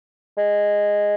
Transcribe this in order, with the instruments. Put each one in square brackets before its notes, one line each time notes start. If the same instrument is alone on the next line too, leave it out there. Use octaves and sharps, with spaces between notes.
[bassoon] G#3